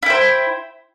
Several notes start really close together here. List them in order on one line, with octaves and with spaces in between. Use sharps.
E4 G5 C5